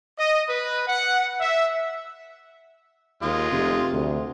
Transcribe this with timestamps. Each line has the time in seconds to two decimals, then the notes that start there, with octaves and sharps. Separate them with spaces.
0.18 D#5
0.49 B4
0.88 F#5
1.40 E5
3.22 D#2 G#3 F4
3.52 F1 C3
3.93 D2